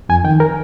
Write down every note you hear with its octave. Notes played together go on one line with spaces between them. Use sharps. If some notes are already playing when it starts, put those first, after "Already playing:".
F2 G#5
D#3 G5
A#4